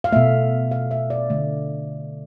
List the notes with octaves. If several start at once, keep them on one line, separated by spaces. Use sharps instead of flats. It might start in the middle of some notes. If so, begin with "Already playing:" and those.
F5
B2 A3 E5
F5
E5
D5
D3 A3